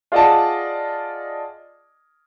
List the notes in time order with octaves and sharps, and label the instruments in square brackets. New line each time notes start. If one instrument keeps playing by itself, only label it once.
[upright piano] F4 G#4 D5 D#5 F#5 A5